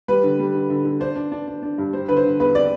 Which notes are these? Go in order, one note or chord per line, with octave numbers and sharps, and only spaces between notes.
G3 B4
D3
G3
D3
D3
D3
D4 C5
D4
D4
D4
D4
G2
G3 C5
D3 B4
C5
D3
E2 B4
C4 D5